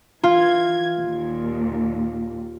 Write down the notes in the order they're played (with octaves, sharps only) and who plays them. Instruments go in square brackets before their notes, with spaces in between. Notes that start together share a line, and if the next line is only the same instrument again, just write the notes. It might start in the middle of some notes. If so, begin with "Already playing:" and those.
[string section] E3 G#6 [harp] F4
[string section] D#2 A#2